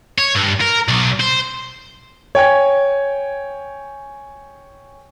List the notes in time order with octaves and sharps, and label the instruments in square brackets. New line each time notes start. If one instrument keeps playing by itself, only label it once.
[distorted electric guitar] C#5
G2
A#4
B1
C5
[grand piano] C#5 G5 G#5 G#6